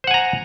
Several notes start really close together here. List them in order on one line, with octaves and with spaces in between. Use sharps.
C5 F#5 G#5 A#5